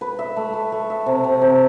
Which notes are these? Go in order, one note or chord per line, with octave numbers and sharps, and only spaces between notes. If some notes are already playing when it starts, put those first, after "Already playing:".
B4
E5
A3
A3
A3
E5
C3
C3
C3